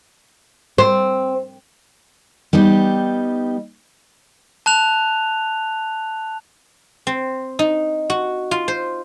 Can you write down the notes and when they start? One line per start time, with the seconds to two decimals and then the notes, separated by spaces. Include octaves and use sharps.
0.78 C4
2.53 G3 B3 D#4 G4
4.66 A5 F#6 F7
7.07 C4
7.59 D#4
8.10 F#4
8.51 F4
8.68 C5